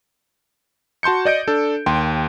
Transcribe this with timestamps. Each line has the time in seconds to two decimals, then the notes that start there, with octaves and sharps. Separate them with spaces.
1.03 F#4 A5 C6 G6 C#7
1.25 D5 D#5 G6 D7
1.48 D4 A4
1.86 D#2 G5 C6